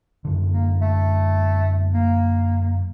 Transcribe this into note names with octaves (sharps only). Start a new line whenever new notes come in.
F#2 D3
A#3
A3
A#3